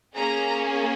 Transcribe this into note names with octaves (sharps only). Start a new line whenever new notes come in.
A#3 C#4 G#4 A#5